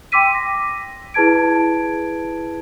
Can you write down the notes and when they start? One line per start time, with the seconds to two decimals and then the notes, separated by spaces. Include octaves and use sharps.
0.12 G5 C6 D6 E6 B6 D#7
0.35 A#6
1.14 E4 G#4 B4 A5 G#6 D7